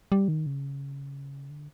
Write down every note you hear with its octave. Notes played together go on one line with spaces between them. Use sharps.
G3
D#3
C#3
D3